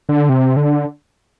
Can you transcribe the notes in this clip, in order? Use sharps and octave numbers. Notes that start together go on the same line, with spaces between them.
D3
C3
D3